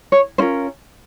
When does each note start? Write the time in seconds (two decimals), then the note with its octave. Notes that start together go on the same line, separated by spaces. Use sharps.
0.12 C#5
0.38 C#4 F4 A#4 C5